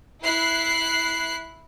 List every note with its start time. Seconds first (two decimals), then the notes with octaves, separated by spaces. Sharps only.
0.22 E4 F#6 C7